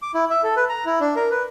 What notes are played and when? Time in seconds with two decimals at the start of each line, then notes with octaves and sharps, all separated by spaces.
0.02 D6
0.14 E4
0.30 E5
0.43 A4
0.56 B4
0.69 A#5
0.85 E4
1.00 D4
1.16 A#4
1.31 B4